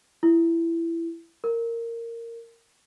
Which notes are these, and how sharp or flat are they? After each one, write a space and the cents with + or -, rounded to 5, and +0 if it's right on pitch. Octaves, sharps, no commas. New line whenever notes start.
E4 +15
A#4 -10